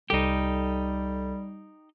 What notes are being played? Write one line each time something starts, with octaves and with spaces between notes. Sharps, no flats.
C2 G3 D#4 G4 A4